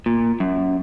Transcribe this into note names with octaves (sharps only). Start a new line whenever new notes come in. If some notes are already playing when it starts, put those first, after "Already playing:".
A#2
F#2